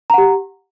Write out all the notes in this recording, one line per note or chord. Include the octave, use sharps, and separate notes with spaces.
G4 F#5 A#5